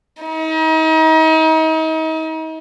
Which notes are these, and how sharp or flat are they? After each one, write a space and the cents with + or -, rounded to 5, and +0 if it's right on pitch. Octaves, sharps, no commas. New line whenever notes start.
D#4 +35